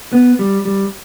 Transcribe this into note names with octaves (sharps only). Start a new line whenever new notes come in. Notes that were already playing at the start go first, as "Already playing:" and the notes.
B3
G3
G3